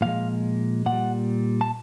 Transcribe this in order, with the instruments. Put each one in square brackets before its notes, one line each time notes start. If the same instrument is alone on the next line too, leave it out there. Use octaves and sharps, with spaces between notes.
[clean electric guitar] A#2 F3 G#3 F5
A#2 F#5
G3
A5